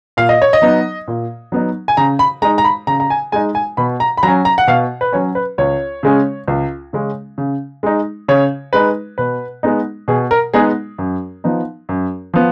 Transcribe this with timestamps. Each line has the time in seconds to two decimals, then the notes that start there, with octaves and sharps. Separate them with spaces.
0.17 A#2 F5
0.29 D#5
0.42 C#5
0.53 D#5
0.62 F#3 B3 D#4
1.08 A#2
1.52 F#3 B3 D#4
1.88 G#5
1.97 C#3 A#5
2.19 B5
2.42 G#3 A#5
2.45 D#4
2.58 A#5
2.64 B5
2.87 C#3 A#5
3.00 A#5
3.10 G#5
3.32 G#3 D#4 G#5
3.55 G#5
3.77 B2 B5
4.00 A#5
4.17 B5
4.23 F#3 C#4 A#5
4.45 A#5
4.58 F#5
4.67 B2 F5
5.01 B4
5.13 F#3 C#4 C#5
5.35 B4
5.58 C#2 C#5
6.03 C#3 G#3 C#4
6.48 C#2
6.93 C#3 G#3 C#4
7.38 C#3
7.83 G#3 D#4
8.28 C#3 C#5
8.73 G#3 D#4 B4
9.18 B2 B4
9.63 G#3 B3 D#4
10.08 B2 G#4
10.31 A#4
10.53 G#3 B3 D#4 G#4
10.98 F#2
11.44 F3 B3 D#4
11.89 F#2
12.34 F3 B3